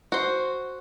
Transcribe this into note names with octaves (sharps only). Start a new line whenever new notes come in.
F#4 C5